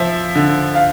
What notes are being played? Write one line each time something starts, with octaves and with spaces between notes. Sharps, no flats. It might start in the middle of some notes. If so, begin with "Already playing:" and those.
Already playing: F3 E5
D3
F5